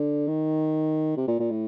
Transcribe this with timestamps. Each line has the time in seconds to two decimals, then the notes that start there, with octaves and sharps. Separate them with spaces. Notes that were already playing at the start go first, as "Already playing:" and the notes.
Already playing: D3
0.27 D#3
1.17 C3
1.28 A#2
1.39 A#2
1.51 A2